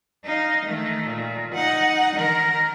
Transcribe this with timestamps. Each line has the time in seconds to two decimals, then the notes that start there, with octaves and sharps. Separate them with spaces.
0.25 D#4 F5
0.66 D#3 A3
1.07 A#2
1.55 D#4 F#5
2.16 D#3 A#4